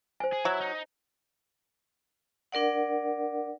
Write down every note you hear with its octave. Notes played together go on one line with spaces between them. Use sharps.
C5 G#5
G#4
F#3 E4 E5
D#4
D4 A#4 D5 F#5